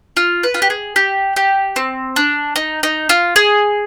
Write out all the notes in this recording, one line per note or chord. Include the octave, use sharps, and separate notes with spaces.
F4
B4
F4
G4
G#4
G4
G4
C4
D4
D#4
D#4
F4
G#4